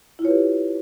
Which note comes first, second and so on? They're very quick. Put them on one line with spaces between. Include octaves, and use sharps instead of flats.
E4 F4 C#5 B4 G4